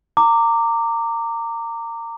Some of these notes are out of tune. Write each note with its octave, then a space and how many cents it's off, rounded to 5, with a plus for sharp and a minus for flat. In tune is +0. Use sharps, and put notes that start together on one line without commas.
A#5 -25 D6 +0